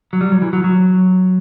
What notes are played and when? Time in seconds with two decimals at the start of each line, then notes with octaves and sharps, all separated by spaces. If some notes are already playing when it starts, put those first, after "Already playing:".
0.13 F#3
0.21 G3
0.32 F#3
0.42 E3
0.53 F#3
0.64 F#3